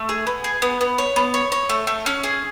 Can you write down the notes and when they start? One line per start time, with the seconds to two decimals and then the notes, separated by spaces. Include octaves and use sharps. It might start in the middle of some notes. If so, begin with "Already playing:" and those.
Already playing: A3
0.09 G#4
0.27 B3
0.44 G#4
0.62 B3
0.81 B3
0.98 C#5
1.16 B3
1.34 C#5
1.52 C#5
1.69 A3
1.87 A3
2.06 C#4
2.24 G#4